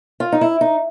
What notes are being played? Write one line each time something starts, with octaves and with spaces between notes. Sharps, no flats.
F4
D#4
E4
D#4